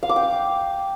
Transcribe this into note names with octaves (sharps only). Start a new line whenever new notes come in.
F5
D6
G5
D6